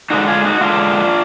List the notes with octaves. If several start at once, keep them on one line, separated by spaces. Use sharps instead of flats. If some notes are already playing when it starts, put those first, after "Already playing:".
D3 G#3 D#4 F#4
F4 G#4
D#4 F#4
D3 G#3 D4 F4